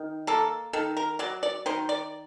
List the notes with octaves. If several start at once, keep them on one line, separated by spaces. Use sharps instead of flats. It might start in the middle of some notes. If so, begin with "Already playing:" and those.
Already playing: D#3
A#3 A4
D#3 A4
A#4
F#3 D5
D5
D#3 C5
D5